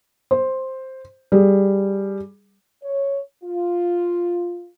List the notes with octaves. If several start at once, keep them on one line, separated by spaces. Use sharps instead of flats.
C5
G3 G#4
C#5
F4